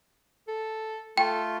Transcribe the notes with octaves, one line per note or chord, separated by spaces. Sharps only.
A4
A3 F4 A4 G5